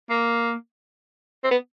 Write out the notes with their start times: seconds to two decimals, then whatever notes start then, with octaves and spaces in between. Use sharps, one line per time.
0.10 A#3
1.44 C4
1.51 B3